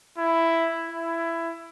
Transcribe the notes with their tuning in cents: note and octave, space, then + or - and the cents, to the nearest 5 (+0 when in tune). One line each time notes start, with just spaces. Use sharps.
E4 +5
E4 +15